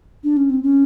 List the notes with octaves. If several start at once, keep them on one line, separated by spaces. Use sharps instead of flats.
D4
C#4
C4
C#4